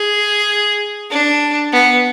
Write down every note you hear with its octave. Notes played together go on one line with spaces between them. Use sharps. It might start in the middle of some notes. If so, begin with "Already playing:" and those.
Already playing: G#4
D4
B3